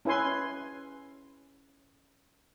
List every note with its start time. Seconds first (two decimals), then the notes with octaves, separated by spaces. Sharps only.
0.05 C#4 E4 B4 G#5 C6